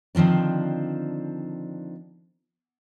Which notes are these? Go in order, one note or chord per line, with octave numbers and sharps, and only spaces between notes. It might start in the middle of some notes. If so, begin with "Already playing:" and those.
D3 D#3 F3 C4 D4